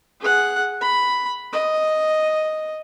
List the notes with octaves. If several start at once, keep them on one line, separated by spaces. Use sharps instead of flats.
G#4 F#5
B5
D#5